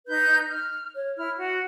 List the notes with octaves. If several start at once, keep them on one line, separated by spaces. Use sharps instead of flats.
D#4 B4 G6
F6
C#5
E4 F6
F#4